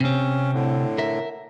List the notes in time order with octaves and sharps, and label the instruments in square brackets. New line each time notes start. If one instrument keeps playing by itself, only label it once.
[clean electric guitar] C3 C4 [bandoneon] C#4
[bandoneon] A2 D3
[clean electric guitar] A#4 E5